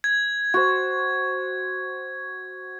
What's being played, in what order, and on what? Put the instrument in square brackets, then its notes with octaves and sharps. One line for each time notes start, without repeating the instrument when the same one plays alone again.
[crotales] G#6
[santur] F#4 C5